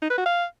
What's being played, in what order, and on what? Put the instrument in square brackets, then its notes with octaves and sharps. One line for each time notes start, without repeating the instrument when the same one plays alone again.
[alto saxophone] D#4
B4
F#4
F5